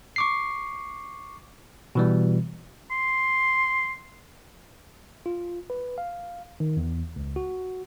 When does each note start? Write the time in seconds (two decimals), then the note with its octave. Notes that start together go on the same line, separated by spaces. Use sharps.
0.16 C#6 D6 C7
1.95 B2 E3 G3
2.91 C6
5.26 F4
5.70 B4
5.98 F5
6.60 D#3
6.77 E2
7.16 C#2
7.36 F#4